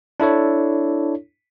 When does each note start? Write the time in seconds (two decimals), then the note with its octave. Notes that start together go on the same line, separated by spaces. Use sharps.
0.20 D4 E4 A4 C#5